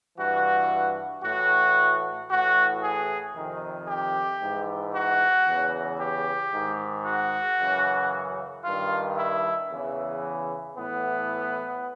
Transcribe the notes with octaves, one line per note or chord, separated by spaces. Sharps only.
G2 E3 F#4
A2 E3 F#4
A2 E3 F#4
G#4
F2 C3 D#3
G4
G#2 E3
F#4
E2 C#3 E3
G4
G#2 D#3
F#4
F#2 C#3 E3
G2 D#3 F4
E4
E2 C#3 E3
A2 E3 B3